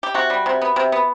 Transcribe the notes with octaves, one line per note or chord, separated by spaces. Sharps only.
G4
C3 F#4
G3
C3
B3
C3
B3